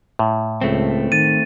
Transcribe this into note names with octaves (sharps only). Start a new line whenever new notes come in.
A2
C#2 A3 C4
D#3 A6 D#7